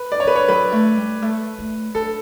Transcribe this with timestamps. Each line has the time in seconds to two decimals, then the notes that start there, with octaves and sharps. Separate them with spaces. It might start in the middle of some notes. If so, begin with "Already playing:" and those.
Already playing: B4
0.12 D5
0.20 C#5
0.25 D3 B4
0.36 C#5
0.48 F#3 B4
0.72 A3
0.97 G3
1.22 A3
1.59 A3
1.95 F#3 A4